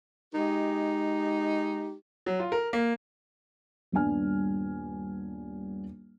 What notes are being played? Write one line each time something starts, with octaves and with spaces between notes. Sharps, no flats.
G#3 D#4 G4
F#3
F4
A#4
A#3
D#1 G2 B3 D4 G#5 F6